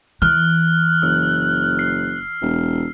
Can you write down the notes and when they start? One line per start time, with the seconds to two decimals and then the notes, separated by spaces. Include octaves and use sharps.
0.22 E3 F6 F#6
1.02 F#1 E6
1.79 C7
2.41 E1